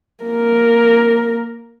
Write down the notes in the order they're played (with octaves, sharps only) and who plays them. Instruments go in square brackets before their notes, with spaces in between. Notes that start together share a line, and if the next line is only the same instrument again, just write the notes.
[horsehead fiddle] A#3 A#4